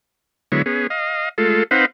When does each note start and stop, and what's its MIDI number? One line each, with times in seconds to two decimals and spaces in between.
0.52 0.62 50
0.52 0.62 54
0.52 0.62 56
0.52 0.62 59
0.52 0.62 64
0.52 0.62 73
0.66 0.87 59
0.66 0.87 61
0.66 0.87 68
0.90 1.29 75
0.90 1.29 77
1.38 1.63 56
1.38 1.63 57
1.38 1.63 65
1.38 1.63 69
1.71 1.86 60
1.71 1.86 63
1.71 1.86 71
1.71 1.86 72
1.71 1.86 77
1.71 1.86 78